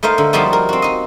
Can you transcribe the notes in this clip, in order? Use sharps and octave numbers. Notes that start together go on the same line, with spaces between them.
A3 D#4 A#4 C5 F5
D3
F3 G3 A#3 D#4 F4 F#4
A#4
C4 F#4
D#4 D#5